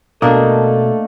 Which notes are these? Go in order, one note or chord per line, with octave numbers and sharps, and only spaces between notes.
B2 A3 A#3 D4 A4 D#5 D#6